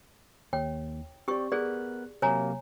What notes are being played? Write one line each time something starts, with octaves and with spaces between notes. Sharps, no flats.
D#2 C#5 G5
C4 G4 D5 C#6
B3 G#4 A#4 D5 F#6
C3 F#3 A#3 C#5 G#5 A#5